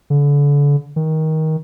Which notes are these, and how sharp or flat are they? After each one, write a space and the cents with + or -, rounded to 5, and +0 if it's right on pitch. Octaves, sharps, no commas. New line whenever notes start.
D3 -35
D#3 +20